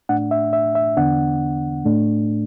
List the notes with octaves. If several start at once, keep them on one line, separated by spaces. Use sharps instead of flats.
A2 A3 D4 F#5
E5
E5
E5
E2 D3 B3 D4 F#5
A2 A3 D4